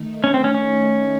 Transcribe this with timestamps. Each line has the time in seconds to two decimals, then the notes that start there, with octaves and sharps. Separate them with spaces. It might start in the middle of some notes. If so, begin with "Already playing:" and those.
Already playing: D#3 A3 D#4
0.24 C#4
0.34 C4
0.44 C#4
0.54 C#4